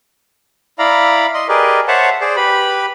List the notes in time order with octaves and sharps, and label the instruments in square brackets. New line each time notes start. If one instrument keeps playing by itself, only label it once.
[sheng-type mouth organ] E4 D5 F5 A#5 B5
D#5 C6
G4 G#4 A#4 B4 D5 D#5
C5 C#5 E5 F#5 A5
G#4 C5 D5
G4 B4 B5